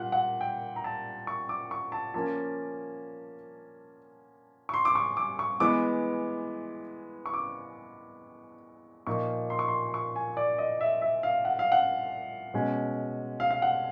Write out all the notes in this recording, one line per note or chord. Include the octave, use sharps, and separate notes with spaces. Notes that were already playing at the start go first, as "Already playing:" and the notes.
Already playing: A#2 G3 F#5
F#5
G5
A#5
A5
C#6
D6
C#6
A5
F3 A#3 C#4 A5
C#6
C6
D6
C#6
D6
C#6
E3 G#3 B3 D6
C#6
D6
A#2 F3 A#3 D#4 C#6
C6
C#6
C6
C#6
G#5
D5
D#5
E5
E5
F5
F#5
F5
F#5
B2 G#3 C#4
F5
F5
F#5